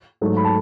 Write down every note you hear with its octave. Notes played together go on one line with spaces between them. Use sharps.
G#2 F#3 A3
B5
A5